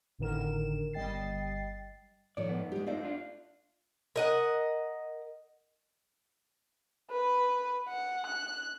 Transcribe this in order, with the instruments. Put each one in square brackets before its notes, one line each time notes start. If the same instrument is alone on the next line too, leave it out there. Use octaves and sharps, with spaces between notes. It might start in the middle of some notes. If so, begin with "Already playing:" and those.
[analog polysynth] G#1 A2 D3 D#3 A#4 E7
G1 G3 D#5 G5 A6 C7
[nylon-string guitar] A2 D#3 F3 [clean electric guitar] C#5 D5
[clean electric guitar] G#2 B3
[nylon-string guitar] G#3 G4
[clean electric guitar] A3 D#4 F4 [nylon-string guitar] C5 D5
[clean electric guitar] D4 F4
[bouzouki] A#4 D#5 F#5
[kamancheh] B4
F#5
F#6